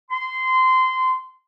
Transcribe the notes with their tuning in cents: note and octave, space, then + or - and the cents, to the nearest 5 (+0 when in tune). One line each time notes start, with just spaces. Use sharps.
C6 -20